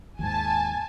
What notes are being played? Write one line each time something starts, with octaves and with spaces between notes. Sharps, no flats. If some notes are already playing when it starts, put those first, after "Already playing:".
D#2 G#2 G#5 A5